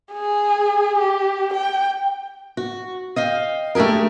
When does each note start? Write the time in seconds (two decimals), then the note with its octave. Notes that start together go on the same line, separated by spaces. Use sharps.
0.12 G#4
0.99 G4
1.54 G5
2.57 F#4
3.16 D#5 F5 G5
3.75 A3 D4 G4 G#4 A#4